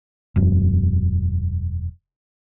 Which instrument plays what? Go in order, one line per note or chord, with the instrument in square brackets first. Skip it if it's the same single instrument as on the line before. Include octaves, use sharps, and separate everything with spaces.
[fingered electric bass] E1 F#2